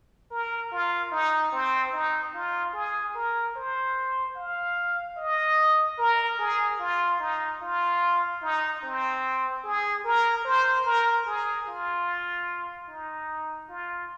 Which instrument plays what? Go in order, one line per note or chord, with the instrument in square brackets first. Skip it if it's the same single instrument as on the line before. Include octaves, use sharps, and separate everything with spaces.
[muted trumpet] A#4
F4
D#4
C4
D#4
F4
G#4
A#4
C5
F5
D#5
A#4
G#4
F4
D#4
F4
D#4
C4
G#4
A#4
C5
A#4
G#4
F4
D#4
F4